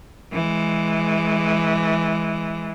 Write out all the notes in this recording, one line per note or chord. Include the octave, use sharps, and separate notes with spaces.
E3 G#3